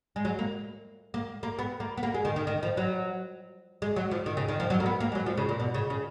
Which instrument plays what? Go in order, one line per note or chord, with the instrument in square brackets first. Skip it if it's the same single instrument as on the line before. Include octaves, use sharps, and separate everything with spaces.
[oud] G#3
F#3
A#3
A#3
A#3
B3
A#3
B3
A#3
G#3
D#3
D#3
D#3
F3
F#3
G#3
F#3
F3
D#3
C#3
D#3
F3
F#3
A#3
B3
A#3
G#3
F#3
F3
C#3
A#2
B2
C#3
C#3